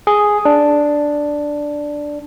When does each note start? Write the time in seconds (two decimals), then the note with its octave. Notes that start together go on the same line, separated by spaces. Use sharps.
0.07 G#4
0.45 D4